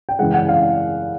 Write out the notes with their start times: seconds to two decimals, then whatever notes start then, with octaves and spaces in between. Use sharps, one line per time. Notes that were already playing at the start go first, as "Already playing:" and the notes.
0.09 G5
0.19 F#2 C#3 E3 G#3 F#5
0.34 F#5
0.49 F5